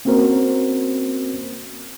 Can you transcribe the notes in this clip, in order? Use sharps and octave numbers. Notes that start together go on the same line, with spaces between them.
A#3 C4 C#4 F#4 A#4 C5